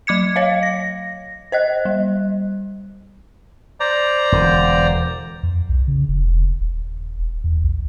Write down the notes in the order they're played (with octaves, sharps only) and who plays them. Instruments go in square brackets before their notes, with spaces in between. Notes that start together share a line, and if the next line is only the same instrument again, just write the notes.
[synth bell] F#3 D6 G#6 C#7
C#5 D#5 F5
A#6
C5 D#5 F#6
G3
[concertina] C5 D5 A#5
[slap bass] E1 D3
[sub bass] F2
B1
C#3
E1
D#1
E2
A#1